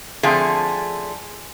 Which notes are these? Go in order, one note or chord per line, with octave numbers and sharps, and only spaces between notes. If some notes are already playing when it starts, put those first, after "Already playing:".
D3 F3 A3 C4 G#4